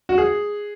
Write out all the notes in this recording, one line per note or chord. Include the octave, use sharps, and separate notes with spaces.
F#4
G#4